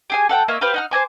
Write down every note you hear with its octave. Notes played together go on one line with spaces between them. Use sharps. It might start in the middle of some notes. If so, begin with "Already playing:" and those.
G4 G#4 G#5
A4 F#5 G5
A#3 C#5 D#5 E5
G4 B4 C5 F5
D#4 F#5 F6
C5 D#5 G#5 D6